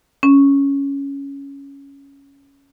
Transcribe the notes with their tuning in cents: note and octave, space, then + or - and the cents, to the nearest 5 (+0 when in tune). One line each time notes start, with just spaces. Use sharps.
C#4 +5